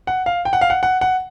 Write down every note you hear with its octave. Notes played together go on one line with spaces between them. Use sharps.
F#5
F5
G5
F#5
F5
F#5
F#5
F#5